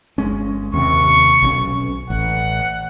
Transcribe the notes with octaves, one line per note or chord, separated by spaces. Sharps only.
G1 G#3 C#4
D#2 C3 C#6
B1 E3 C#4
A1 F#5